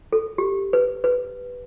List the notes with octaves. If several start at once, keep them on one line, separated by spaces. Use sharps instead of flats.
A4
G4
B4
B4